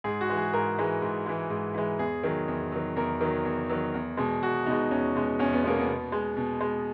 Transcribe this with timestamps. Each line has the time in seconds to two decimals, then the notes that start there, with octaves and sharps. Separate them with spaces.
0.04 G#2 G#4
0.21 F#4
0.30 E3 G#3
0.37 G#4
0.53 G#2 A#4
0.78 E3 G#3
1.02 G#2
1.26 E3 G#3
1.50 G#2
1.74 E3 G#3
1.99 E2 G#4
2.23 D#3 F#3
2.48 E2
2.72 D#3 F#3
2.96 E2 A#4
3.21 D#3 F#3
3.45 E2
3.69 D#3 F#3
3.94 E2
4.17 B2 G#3
4.42 E2 F#4
4.66 B2 G#3 D#4
4.91 E2 C#4
5.15 B2 G#3
5.39 E2 C#4
5.53 B3
5.64 B2 G#3 A#3
5.80 B3
5.88 B2
6.12 G#3
6.37 B2
6.61 G#3